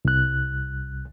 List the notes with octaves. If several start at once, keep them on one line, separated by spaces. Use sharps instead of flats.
C2 F#6